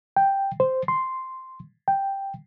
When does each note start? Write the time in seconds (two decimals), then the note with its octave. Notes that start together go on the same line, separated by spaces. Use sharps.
0.17 G5
0.60 C5
0.88 C6
1.88 G5